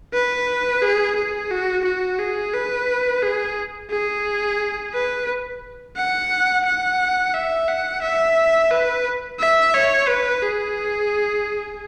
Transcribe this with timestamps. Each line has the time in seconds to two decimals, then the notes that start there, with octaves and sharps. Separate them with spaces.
0.14 B4
0.82 G#4
1.17 G#4
1.51 F#4
1.85 F#4
2.19 G#4
2.54 B4
3.23 G#4
3.91 G#4
4.93 B4
5.97 F#5
6.66 F#5
7.34 E5
7.68 F#5
8.02 E5
8.71 B4
9.39 E5
9.74 C#5
10.08 B4
10.43 G#4